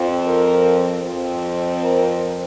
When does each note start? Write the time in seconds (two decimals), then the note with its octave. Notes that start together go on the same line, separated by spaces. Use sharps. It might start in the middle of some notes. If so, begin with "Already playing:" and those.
Already playing: F2 F3 C4
0.25 A#4
1.03 F2 F3 C4
1.81 A#4